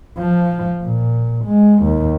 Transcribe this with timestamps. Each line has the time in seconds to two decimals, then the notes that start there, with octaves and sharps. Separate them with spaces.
0.18 F3
0.83 A#2
1.45 G#3
1.83 D#2